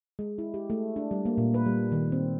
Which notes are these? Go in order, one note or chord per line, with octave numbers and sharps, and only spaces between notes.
G#3
E4
G4
A3
D4
G3
A#3
A#2
B4
G3
D#3
C4